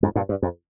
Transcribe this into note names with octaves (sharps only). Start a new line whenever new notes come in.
F2 G#2
G2 A#2
G2
F2